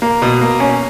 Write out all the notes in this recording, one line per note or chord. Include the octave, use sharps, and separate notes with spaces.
A#3
B2
A#3
C#4